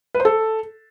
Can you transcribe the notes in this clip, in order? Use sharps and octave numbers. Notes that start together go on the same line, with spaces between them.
B4
C5
A4